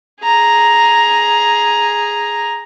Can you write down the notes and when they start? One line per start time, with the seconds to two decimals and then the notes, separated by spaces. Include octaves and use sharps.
0.23 G#4 A#5